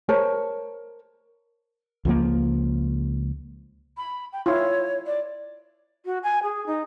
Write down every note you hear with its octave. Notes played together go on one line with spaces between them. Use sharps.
A#4 C5 C#5 A5
C#2 F3 A#3
B5
G5
E4 F4 C#5
D5
F#4
G#5
G#4
D#4